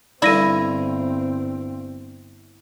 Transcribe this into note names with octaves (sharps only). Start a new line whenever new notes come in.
G1 G2 D3 C4 E4 D5 A#6 D#7